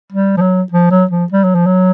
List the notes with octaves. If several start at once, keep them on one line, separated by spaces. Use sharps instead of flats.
G3
F3
F#3
F3
F#3
F3
G3
F#3
F3
F#3